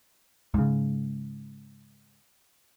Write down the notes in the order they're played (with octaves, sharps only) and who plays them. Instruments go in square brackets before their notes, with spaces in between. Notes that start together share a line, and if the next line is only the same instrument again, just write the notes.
[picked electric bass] G#2 C#3